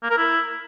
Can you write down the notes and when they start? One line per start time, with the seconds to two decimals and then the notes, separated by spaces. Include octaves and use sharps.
0.03 A#3
0.10 A#4
0.17 E4